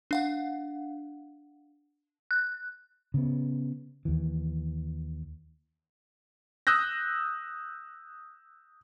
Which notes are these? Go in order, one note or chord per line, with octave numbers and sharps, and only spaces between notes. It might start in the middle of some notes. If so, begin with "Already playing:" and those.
D4 F5 F#5
F#6
C#3 B3
D#2 E3
D#6 E6 F#6 G6 A#6